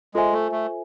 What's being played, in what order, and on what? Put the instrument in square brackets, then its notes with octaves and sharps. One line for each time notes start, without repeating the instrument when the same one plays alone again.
[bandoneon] G#3 [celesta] F4 A4 C5 E5 G#5
[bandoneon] A3
A3